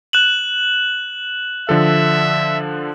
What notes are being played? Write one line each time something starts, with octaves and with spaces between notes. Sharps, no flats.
F#6 E7 F#7
D3 F3 A4 E5